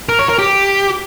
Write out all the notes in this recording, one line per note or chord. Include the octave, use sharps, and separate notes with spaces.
A#4
C#5
A#4
G4